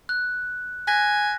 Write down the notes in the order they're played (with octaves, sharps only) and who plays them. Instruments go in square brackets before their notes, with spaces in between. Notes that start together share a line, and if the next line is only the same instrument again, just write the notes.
[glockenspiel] F#6
[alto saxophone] G#5 [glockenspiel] F#6 A#6 B6